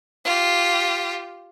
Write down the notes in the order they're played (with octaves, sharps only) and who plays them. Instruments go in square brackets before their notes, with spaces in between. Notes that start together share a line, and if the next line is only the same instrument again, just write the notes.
[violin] F4 G4